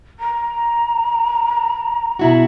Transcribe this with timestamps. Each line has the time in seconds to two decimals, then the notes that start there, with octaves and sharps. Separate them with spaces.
0.20 A#5
2.19 B2 E4 F#4